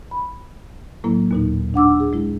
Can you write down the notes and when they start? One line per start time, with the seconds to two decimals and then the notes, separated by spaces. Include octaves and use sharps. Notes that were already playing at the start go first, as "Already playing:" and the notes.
0.11 B5
1.04 A2 F#3 A#3 E4
1.31 D#2 A#2 D#4
1.74 D4 F#5 D6 E6
2.00 G#4
2.13 G#3 E4